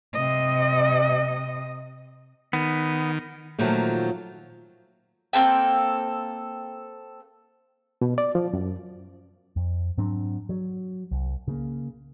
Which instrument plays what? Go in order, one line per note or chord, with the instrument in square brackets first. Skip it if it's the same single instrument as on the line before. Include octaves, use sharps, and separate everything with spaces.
[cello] C3 D#5
[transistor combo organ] D#3 [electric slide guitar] B3
[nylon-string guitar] A#2 D#3 F3 F#3 A3
[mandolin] A#3 C4 A4 G5
[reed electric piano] B2
D5
F3
F#2
[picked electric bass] F2
G#2 F#3 C4 D4
F#3
C2
C#3 A#3